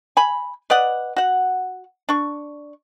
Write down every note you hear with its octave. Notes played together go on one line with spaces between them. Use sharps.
G#5 B5
B4 D5 D#5 F#5
F#4 F#5
D4 C#6